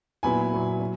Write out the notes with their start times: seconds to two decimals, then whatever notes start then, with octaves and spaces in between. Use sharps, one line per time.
0.23 A#2 F#3 B3 E4 G#5 B5
0.53 A#2 F#3 B3 E4
0.80 F#3